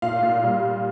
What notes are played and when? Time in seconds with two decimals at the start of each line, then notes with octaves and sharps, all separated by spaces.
0.02 A#2 F5
0.23 A#2
0.43 G3